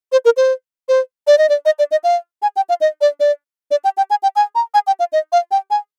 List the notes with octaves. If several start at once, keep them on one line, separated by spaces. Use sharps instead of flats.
C5
A#4
C5
C5
D5
D#5
D5
D#5
D5
D#5
F5
G#5
G5
F5
D#5
D5
D5
D5
G5
G5
G#5
G5
G#5
A#5
G#5
G5
F5
D#5
F5
G5
G#5